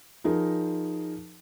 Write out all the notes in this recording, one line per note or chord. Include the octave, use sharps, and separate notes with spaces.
F3 D#4 G#4 A#4